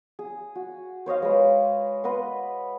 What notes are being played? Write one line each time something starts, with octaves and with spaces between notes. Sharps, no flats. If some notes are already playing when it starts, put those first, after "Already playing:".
G#4
F#4
C5 C#5 D#5 F5
G#3 B4
B4 D#5 F#5 C6